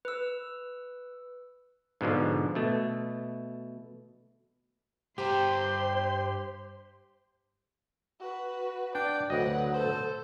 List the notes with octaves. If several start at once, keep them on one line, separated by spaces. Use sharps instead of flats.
B4 E6
G#2 B2 D3 F3
B2 A3
G2 G4 C5 G5 A#5 C6
F#4 B4
D4 D5 G5
D2 F#3 B4 D#5 F#5
A4 C5